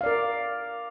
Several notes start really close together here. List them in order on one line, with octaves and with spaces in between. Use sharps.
F5 D5 A#4